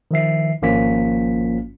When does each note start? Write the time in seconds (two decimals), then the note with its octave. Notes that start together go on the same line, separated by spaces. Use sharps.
0.11 D#3 F3 E5 C7
0.62 G#1 F3 A#3 C#4 F4 B6